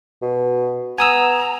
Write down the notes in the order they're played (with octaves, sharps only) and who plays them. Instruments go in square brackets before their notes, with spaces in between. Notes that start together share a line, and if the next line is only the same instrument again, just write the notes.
[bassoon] B2
[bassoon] B3 [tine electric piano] G#5 D#6 E6 [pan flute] A#5